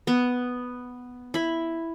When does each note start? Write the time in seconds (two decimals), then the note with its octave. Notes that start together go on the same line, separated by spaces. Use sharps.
0.07 B3
1.34 E4 B5